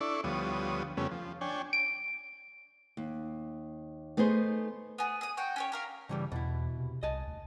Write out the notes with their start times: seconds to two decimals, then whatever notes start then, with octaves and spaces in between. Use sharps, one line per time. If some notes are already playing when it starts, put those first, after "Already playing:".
0.01 D4 E4 A4 D5 C#6
0.24 D2 F3 G3 B3 C#5 D#6
0.97 F2 C#3 G3 A3 B3 C#4
1.11 F3
1.41 D4 C#5 G5 G#5
1.73 D7
2.97 D#2
4.17 A3 B3 D#4 G#4 C5
4.98 B3 G#4
5.21 G#4 D#6
5.37 F#4 C#5 F#5 G5
5.56 C#4 G4 C#5
5.72 G4 A#4 F5
6.09 G2 C#3 E3 G3
6.32 E2 B2 E4
6.77 C3
7.03 C2 D#5 G#5 A5
7.27 D2